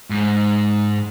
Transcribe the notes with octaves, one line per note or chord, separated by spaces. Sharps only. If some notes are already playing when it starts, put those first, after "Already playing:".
G#2